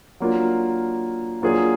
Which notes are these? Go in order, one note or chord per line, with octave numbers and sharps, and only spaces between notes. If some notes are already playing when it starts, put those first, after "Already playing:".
F#3 A#3 D4 F4
F#3 A#3 D4 F4 G#4